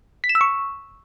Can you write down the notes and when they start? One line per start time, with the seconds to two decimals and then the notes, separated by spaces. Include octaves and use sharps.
0.24 B6
0.29 E7
0.35 E6
0.41 C#6